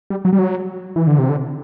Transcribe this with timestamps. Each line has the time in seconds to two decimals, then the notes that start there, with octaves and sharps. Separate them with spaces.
0.10 G3
0.25 F#3
0.33 G3
0.39 F#3
0.96 E3
1.07 D3
1.19 C3
1.29 D3